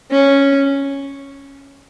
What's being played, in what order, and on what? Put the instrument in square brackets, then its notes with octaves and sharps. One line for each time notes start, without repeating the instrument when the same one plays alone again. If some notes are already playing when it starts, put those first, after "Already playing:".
[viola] C#4